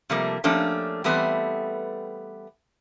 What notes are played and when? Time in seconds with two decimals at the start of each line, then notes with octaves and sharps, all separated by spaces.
0.10 C3 F3 G3 A3 A#3
0.44 F3 A3 A#3 C#4 D4 G4
1.04 E3 G3 A3 B3 C4